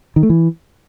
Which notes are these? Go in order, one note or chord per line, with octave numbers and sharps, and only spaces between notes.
D#3
A3
E3